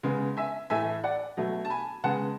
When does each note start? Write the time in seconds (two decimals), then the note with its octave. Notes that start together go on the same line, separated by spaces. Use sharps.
0.03 C#3 G#3 B3
0.37 E5 G#5
0.70 A2 E3 A3 E5 G#5
1.04 D5 F#5
1.37 B2 F#3 A3
1.65 A5
1.70 G#5 B5
2.04 C#3 G#3 B3 F#5 A5